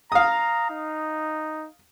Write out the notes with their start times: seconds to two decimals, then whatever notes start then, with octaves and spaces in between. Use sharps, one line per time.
0.12 F5 A#5 D#6
0.70 D#4